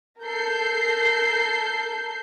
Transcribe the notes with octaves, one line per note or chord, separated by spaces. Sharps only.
A4 A#4 G6 C7